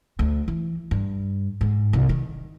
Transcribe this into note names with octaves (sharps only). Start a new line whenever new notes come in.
D2
E3
G2
G#2
C2
D#3